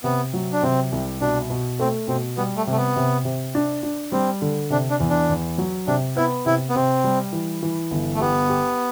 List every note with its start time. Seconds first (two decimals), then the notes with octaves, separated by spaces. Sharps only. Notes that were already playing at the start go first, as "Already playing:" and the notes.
0.04 C3 B3
0.34 F#3
0.53 D4
0.62 C3 C4
0.92 C2
1.21 B2 D4
1.50 B2
1.79 A3 C4
2.08 B2 C4
2.37 G3 B3
2.56 A3
2.67 C3 A3
2.77 B3
2.96 C3
3.25 C3
3.55 D4
3.83 D4
4.12 G3 C4
4.42 D3
4.70 C3 D4
4.90 D4
5.00 E2
5.10 D4
5.29 E2
5.58 F#3
5.87 C3 D4
6.16 B3 E4
6.46 C3 E4
6.69 B3
6.75 C3 C4
7.04 G3
7.33 E3
7.63 E3
7.91 G1
8.14 A3
8.20 B3 G4
8.49 G4